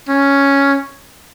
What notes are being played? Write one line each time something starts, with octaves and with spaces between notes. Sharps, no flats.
C#4